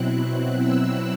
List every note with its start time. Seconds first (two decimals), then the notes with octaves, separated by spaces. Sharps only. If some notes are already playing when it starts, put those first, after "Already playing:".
Already playing: B2 F#3 C4 E4 F#6
0.20 F#6
0.62 E6